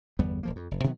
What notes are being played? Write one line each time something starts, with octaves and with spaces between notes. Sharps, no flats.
G1 E2 G3 B3
D#1 F3 A#3
F2
F#1
B2 D#3 F#3 B3